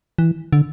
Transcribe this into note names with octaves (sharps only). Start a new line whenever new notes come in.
E3
D3